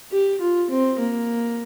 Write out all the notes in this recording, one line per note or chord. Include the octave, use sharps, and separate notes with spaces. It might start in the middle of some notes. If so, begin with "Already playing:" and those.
G4
F4
C4
A#3